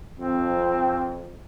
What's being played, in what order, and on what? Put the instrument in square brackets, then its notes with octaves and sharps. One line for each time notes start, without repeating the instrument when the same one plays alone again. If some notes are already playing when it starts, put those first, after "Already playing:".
[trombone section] F2 [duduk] C4